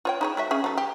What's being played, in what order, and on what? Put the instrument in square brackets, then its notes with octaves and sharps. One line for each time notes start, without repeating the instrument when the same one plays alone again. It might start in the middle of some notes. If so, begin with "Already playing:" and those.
[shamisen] F4 C#5 G5
D#4 G#4 C#5
A3 F#4 E5
C#4 G#4 E5
F#3 A4
G4